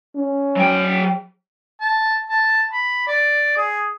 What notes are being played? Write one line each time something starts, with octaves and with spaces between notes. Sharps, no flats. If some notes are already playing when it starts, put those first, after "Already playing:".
C#4
F#3 G5
A5
A5
B5
D5
G#4